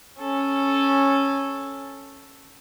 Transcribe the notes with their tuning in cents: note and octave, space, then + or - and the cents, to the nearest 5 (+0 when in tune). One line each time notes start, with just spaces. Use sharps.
C#4 -5 A4 +0